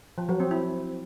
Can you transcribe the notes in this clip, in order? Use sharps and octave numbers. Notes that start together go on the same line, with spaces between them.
F3
F#3
C4
E4